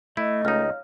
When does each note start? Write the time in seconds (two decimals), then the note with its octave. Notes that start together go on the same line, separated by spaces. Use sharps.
0.17 A3 E4 D#5
0.45 C#2 D#4 C#5 F5 F6